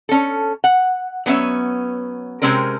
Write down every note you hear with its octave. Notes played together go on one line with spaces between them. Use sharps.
C#4 A4
F#5
F#3 B3 C#4 E5
C3 G#3 C4 C#4 A#4